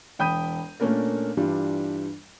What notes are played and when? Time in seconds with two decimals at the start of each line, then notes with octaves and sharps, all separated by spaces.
0.19 E1 G5 B5 D#6 G6 D#7
0.80 A#2 A3 A#3 C#4 D4 A#4
1.37 G2 E3 G3 D4 F4